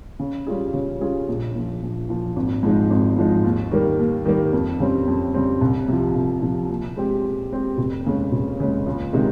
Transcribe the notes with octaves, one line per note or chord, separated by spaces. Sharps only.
C#3
G3 C#4 F4 G#4
C#3
G3 C#4 F4 G#4
A#1
A#2 F3
A#1
A#2 F3
G#1
G#2 F3 G#3 D#4
G#1
G#2 F3 G#3 D#4
D#2
D#3 G3 A#3
D#2
D#3 G3 A#3
F2
C#3 G3 C4
F2
C#3 G3 C4
C2
C3 F3
C2
C3 F3
A#2
G#3 C4 G4
A#2
G#3 C4 G4
F1
D#2 C#3 G#3
F1
D#2 C#3 G#3
C#2
C3 D#3 G#3 D#4